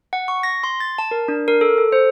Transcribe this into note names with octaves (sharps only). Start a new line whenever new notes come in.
F#5
C#6
A#6
C6
A6
A5
A#4
D4
A#4
A4
A4
C5